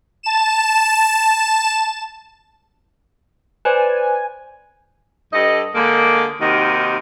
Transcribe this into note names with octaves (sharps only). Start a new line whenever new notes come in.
A5 E7
B4 C5 D5 G#5
G2 A4 D#5
D3 G#3 A#3
D#2 C3 D#3 F#4 A#4 D#5